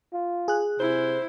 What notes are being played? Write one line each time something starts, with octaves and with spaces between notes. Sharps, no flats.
F4
G#4 F#6
C3 E4 C5